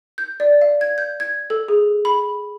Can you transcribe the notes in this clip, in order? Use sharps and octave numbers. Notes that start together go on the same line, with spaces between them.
G6
D5
F5
G#6
G6
G#6
A4
G#4
B5